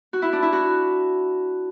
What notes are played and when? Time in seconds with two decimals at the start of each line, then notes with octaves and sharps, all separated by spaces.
0.13 F#4
0.22 E4
0.33 D4
0.42 E4
0.53 F#4